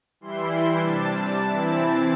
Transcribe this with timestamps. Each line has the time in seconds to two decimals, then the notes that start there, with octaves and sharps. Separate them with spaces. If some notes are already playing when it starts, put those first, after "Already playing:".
0.21 E3 G3 E4 C6
0.79 C3 G3 D4 A5
1.37 E3 C4 E4